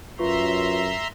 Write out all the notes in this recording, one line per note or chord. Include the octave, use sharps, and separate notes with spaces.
F#2 F4 B4 E5 A#5 C6 C#6